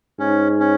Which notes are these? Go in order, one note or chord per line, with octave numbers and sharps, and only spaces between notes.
G#2 C#4
C#4